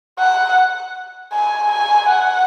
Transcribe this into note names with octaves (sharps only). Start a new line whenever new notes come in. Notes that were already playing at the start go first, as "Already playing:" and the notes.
F#5
G#5
G#5
F#5